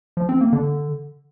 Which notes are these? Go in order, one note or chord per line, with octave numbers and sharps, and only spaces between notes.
F3
C4
A#3
D3